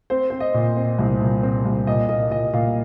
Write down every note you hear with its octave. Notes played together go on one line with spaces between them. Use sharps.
C4 C5
C4 C5
D#5
A#2
C4
C2
A#2
C4
C2
A#2 D#5
A#3 D#5
A#2 D#5
A#2 F5